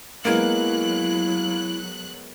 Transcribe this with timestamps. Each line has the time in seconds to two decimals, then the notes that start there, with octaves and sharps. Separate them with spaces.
0.25 F#3 G#3 A#3 B3 E4 A#4 F#6